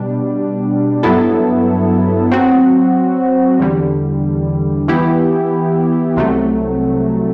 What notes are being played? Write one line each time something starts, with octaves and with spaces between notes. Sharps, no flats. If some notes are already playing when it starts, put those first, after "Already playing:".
Already playing: B2 G3 D4
G2 F#3 B3 E4 A4
F#3 C4 F#4
E2 D3 G3
E3 B3 E4 G4
C2 C3 F#3 A3